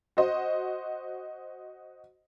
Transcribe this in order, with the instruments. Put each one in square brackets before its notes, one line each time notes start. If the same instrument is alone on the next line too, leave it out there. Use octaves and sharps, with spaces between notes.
[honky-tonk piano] F#4 C5 D#5